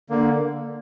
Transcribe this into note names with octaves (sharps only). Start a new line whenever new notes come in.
D3 A#3